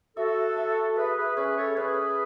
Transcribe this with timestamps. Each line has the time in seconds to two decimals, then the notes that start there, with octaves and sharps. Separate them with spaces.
0.16 F#4 A4 E5
0.56 E5
0.96 G#4 B4 E5
1.16 G#4 B4
1.36 C#4 G#4 B4
1.57 A4 C#5
1.77 C#4 G#4 B4